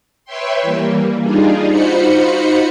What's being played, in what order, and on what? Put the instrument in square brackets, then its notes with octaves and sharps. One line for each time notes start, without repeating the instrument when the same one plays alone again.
[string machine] B4 C#5 E5 G5 C6
E3 G3 A#3
G3 D4 D#4 F4 G#4
D#4 F4 F#4 C5 B5 C#7